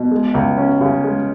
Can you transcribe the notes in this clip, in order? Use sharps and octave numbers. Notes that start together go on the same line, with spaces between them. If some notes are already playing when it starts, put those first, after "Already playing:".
Already playing: B2
G#3
C#2
C#4
C#3
G#3